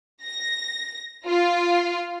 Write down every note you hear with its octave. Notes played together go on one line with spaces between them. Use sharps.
A#6
F4